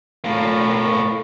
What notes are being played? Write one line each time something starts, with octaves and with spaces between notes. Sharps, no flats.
A2 A#3